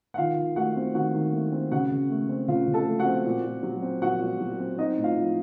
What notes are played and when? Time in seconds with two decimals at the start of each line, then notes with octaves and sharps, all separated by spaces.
0.14 F#5
0.18 D#3 F4 F5
0.37 D#3
0.56 A3 F#4 F#5
0.76 C4
0.94 D#3 F#4 F#5
1.14 D#3
1.33 A3
1.52 C4
1.71 C#3 F#4 F#5
1.91 C#3
2.10 A3
2.29 C4
2.48 C#3 F4 F5
2.67 C#3
2.74 A4 A5
2.87 A3
2.99 F#4 F#5
3.05 C4
3.25 A#2
3.44 A#2
3.63 F#3
3.82 C4
4.02 A#2 F#4 F#5
4.21 A#2
4.40 F#3
4.60 C4
4.78 C4 D#4 D#5
4.98 A2
5.04 F4 F5
5.17 F3